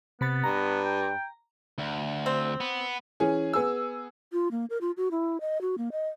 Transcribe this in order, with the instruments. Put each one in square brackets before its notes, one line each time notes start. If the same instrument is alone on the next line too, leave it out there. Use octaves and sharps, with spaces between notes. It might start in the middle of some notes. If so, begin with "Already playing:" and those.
[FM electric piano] C3 B5 A6 [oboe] B3
[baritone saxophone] G2 [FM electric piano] A#5
[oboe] G5
[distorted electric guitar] D2
[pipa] C4
[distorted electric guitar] B3
[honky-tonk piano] E3 C#4 G#4
B3 G#4 E6
[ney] F4
A#3
A#4
F4
F#4
E4
D#5
F#4
A#3
D#5